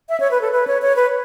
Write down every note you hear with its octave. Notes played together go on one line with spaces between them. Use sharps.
E5
C#5
B4
A4
B4
C#5
C#5
B4